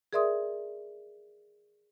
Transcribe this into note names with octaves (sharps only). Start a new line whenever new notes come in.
G#4 A#4 D5 E5 C6 D#6